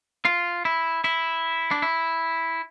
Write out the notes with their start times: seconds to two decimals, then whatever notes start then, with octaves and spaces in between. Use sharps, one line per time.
0.25 F4
0.65 E4
1.04 E4
1.71 D4
1.82 E4